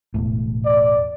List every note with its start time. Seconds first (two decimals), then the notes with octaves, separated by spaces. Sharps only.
0.14 E1 A2
0.65 D5